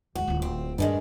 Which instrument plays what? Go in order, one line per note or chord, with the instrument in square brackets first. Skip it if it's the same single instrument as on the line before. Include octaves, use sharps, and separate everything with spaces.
[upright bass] E2 G#2 [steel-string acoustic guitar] F#4
[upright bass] D1 F4
[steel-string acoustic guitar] C4
[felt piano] G2 [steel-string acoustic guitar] D#3 G#3 D4